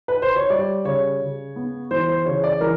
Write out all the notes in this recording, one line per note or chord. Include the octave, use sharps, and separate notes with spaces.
B4
C5
C#5
G3 D5
C#3 C#5
C#3
B3
E3 C5
C5
C#3 C#5
D5
E3 A#4